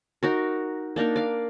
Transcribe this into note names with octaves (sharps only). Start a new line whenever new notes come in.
D#4 F#4 A#4
A#3 D4 D#4 A#4
D5 F5